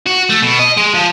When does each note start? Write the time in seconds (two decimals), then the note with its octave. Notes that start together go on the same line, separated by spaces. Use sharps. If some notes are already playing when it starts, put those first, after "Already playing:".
0.06 F#4
0.30 A3
0.43 B2
0.59 D#5
0.77 G#3
0.95 F3